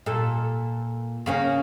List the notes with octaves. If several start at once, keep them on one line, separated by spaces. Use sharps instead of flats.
A#2 A4
C#3 A#3 C#4